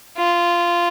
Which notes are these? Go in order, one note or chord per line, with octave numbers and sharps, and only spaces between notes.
F4